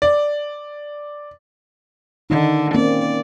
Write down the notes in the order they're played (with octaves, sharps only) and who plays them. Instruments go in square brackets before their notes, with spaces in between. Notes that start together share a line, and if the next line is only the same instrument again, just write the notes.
[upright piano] D5
[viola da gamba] D3 [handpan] D#3 D#4
[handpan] A#3 C4 C#4 [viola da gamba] D5